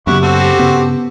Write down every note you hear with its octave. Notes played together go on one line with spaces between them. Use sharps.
F#2 C#3 A#3 B3 E4 G4 F#5 C#6
C4 F#4 A4
G4
G2 C#3 B3 C#4